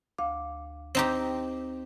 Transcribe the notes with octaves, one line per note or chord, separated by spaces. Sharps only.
D2 F5 D6
C4 D#4 G4